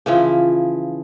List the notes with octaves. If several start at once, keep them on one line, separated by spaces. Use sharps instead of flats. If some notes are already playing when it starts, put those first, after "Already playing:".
C#3 E3 F3